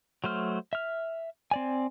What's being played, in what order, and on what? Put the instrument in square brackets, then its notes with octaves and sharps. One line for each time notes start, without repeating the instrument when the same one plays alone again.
[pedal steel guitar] F#3 A3 C5 F6
E5 F6
C4 D5 G#5